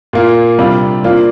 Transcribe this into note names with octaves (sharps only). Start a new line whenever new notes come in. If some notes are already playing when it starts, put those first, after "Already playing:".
A#2 A#3 F4
C3 G3 D4 F4
F3 A#3 D4 F4